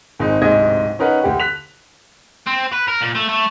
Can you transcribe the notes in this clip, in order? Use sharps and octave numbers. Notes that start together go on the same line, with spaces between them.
G#1 G#3 C4 D#4
D1 G#2 C3 G#3 D#5 G#6
C#4 D#4 A#4 B4 F#5
D2 G4 F#5
F#6 B6 F7
C4
B4
A#4
A#2
A3
A3